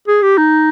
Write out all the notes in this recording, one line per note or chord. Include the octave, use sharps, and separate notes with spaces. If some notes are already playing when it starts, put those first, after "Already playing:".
G#4
G4
D#4